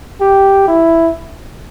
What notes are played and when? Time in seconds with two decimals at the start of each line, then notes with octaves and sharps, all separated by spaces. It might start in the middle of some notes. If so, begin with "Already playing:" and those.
0.21 G4
0.68 E4